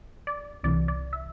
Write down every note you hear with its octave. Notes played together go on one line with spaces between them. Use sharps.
D5
C2 C3 E3 D5
D5
E5